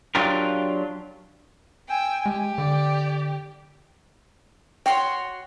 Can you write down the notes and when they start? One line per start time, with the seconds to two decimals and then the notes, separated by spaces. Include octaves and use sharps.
0.15 F#3 D4 F4 G4 A#4
1.89 G5 G#5 E6
2.26 G#3 G4
2.58 D3 D5
4.86 F#4 C#5 G5 C6